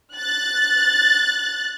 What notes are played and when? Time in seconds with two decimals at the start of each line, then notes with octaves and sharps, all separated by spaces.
0.15 F#6 A6